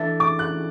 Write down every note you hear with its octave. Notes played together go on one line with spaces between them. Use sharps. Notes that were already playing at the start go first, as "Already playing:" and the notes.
Already playing: E3 D4 A4
D6
F#6